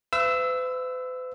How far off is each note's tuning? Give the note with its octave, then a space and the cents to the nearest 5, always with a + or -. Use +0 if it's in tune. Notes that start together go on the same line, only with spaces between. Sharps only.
B4 +45 E5 +45 E6 +0